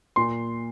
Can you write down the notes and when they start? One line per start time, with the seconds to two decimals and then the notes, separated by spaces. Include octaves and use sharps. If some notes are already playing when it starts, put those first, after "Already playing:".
0.16 A#2 C6